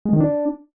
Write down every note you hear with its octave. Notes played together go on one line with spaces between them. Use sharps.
G#3
D#3
D4